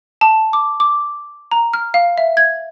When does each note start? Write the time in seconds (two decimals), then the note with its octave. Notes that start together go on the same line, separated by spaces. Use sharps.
0.21 A5
0.53 D6
0.80 D6
1.51 A#5
1.73 F6
1.94 F5
2.18 E5
2.37 G#6